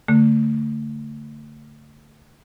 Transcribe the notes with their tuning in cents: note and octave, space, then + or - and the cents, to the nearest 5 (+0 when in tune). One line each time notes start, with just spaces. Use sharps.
D3 -25 A3 +30